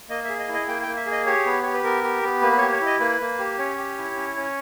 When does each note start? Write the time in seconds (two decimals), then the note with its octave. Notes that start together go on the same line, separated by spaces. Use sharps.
0.09 A#3 D#5
0.24 G#4 E5
0.39 D#5
0.48 E4
0.53 D#5
0.68 A#3 G5
0.82 A#3 G5
0.97 E5
1.06 G#4
1.12 D#5
1.26 G4 C#5
1.46 B3
1.63 G4 C#5
1.74 B4
1.83 B3 A#4
2.04 G4
2.23 B3
2.42 A#3 B4
2.52 B4
2.57 G4 C#5
2.72 C#5
2.81 E4 D#5
3.00 A#3 B4
3.20 A#3
3.39 G4
3.58 C#4 C#5
3.77 G4
3.98 E4
4.16 C#4
4.37 C#4